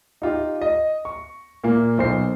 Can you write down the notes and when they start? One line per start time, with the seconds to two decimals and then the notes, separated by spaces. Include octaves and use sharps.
0.22 D#4 F4 G4
0.61 D#5
1.05 C#6
1.64 A#2 A#3
1.98 B1 C5 C7